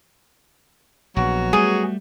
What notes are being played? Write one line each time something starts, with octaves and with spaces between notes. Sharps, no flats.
A#1 F#3 B3 F#4
G3 A3 G#4